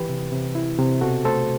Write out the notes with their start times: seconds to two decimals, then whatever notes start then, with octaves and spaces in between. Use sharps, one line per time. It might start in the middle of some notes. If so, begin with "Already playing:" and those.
Already playing: E3 G4 B4
0.09 C3
0.32 C3
0.55 E4
0.78 C3
1.01 B2 F#4 A4
1.25 A3 A4 C5